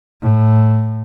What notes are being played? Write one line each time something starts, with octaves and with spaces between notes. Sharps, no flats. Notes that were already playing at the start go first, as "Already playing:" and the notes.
A2